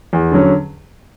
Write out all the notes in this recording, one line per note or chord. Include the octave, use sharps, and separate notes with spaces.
E2
D3 F#3 C#4